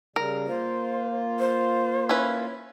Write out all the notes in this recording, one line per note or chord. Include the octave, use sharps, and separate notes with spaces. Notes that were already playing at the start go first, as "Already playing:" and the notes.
C#3 G3 A#4
A#3 F4 C5
C5
C#4 E4 B4